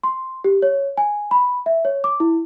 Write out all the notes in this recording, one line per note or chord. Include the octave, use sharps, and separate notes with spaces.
C6
G4
C#5
G#5
B5
E5
C#5
D6
E4